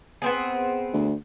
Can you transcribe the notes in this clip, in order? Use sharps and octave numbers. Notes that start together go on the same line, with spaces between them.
B3 C4 G#4
D2